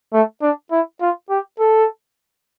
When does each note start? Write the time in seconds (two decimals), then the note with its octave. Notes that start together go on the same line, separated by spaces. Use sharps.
0.13 A3
0.42 D4
0.71 E4
1.01 F4
1.30 G4
1.59 A4